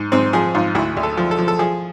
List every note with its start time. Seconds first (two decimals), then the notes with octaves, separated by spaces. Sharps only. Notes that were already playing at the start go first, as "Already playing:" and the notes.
Already playing: G#2
0.12 G#2 C4
0.33 F3 G#4
0.55 G#2 F4
0.75 D2 E4
0.97 D2
1.03 A4
1.17 F3
1.31 A4
1.38 F3
1.48 A4
1.59 F3 G#4